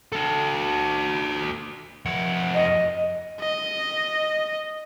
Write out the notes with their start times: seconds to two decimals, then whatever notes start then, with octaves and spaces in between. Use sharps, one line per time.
0.12 F#4 A4
2.05 F2 F#5
2.55 D#5
3.40 D#5